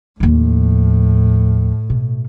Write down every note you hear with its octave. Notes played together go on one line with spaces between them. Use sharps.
D#2 A2 F3
B2